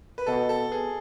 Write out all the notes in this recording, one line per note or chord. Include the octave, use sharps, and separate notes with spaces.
B4
B2 A4
A4
G#4